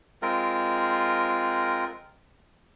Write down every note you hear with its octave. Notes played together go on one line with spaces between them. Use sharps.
G#3 C4 F4 A#4